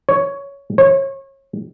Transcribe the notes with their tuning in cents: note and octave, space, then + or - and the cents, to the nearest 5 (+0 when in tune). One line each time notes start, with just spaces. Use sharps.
C#5 +10
C#5 -30